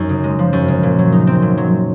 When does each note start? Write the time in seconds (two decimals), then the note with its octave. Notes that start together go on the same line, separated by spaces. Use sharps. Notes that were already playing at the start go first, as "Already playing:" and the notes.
Already playing: F#2 D#4
0.09 C#3
0.24 G#3
0.39 F3
0.53 F#2
0.68 C#3
0.83 A#2
0.99 F#3
1.12 D#4
1.27 C4
1.42 A#2
1.58 F#3